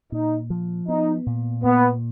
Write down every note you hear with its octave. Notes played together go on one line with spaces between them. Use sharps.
A#2 D#4
F3
B3 D#4
A#2
A#2 B3